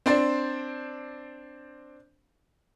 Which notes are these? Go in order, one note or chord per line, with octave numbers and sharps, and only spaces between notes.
C4 D4 C5 D5